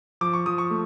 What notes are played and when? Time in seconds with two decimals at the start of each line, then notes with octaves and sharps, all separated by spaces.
0.21 F3 D6
0.33 C#6
0.46 F3 D#6
0.58 C#6
0.70 A3